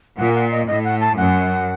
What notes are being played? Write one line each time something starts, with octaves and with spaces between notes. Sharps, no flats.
A#2 F#5
F#5
D#5
A2 D#5
F#5
A5
F#2 F#5